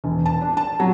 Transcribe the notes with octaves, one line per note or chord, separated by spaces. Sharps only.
E1
A5
D4
A5
F#3